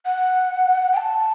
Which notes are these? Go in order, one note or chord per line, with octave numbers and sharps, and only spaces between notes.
F#5
G5
A5